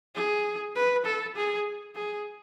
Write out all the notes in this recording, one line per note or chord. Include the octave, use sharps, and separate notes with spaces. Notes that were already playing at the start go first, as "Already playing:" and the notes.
G#4
B4
A4
G#4
G#4